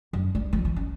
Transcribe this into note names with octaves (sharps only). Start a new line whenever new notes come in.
F#2
G3
F3
E3
C#4